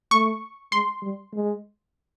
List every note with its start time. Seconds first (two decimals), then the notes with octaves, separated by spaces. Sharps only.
0.11 A3 C#6
0.72 G#3 C6
1.02 G3
1.34 G#3